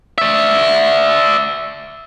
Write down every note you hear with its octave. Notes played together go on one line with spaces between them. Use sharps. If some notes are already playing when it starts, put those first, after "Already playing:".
D5 E5